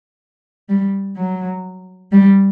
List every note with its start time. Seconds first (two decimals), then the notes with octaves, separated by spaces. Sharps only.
0.69 G3
1.17 F#3
2.12 G3